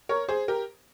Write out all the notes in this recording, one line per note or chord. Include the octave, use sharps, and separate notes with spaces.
A#4 C#5
G#4 C5
G4 A#4